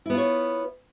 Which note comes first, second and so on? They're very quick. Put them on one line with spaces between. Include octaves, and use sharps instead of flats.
E4 B3 F4 C#5